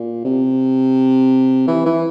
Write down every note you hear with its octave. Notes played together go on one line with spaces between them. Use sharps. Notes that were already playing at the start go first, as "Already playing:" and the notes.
Already playing: A#2
C3
E3
E3